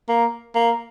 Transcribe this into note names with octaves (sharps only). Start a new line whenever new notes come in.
A#3
A#3